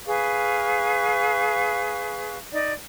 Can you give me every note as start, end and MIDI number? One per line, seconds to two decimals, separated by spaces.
0.06 2.38 68
0.06 2.38 71
0.06 2.38 77
0.06 2.38 85
2.51 2.73 63
2.51 2.73 74